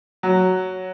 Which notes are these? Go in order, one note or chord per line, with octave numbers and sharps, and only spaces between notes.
F#3